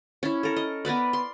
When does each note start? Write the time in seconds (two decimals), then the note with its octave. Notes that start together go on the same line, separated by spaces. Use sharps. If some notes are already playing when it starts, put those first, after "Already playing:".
0.23 C#4 E4
0.43 A4 A#4
0.56 D#5
0.85 B3 A#4 B4 D5
1.13 C6